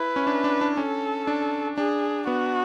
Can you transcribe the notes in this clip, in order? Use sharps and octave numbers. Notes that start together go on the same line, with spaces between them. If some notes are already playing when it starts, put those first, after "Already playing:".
Already playing: E4 B4
C#4
D4
D4
D4
C#4 A4
D4
D4 G#4
B3 F#4